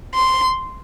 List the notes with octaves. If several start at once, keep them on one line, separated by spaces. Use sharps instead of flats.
C6